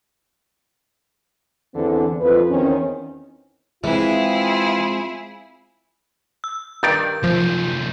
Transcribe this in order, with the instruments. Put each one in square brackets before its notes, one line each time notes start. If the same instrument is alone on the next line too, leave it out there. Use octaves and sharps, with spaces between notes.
[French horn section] E2 D3 E3 B3 C4 D4
F2 F3 B4
E2 D#3 C4 C#4
[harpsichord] E3 [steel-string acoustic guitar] G#3 C4 [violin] E4 G#4 [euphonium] F4
[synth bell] E6
[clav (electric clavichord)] G2 D#3 D5 [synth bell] G6
[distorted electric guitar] F#2 C3 [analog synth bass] F3